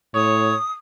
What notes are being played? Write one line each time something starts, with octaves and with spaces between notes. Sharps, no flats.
A2 C#5 D#6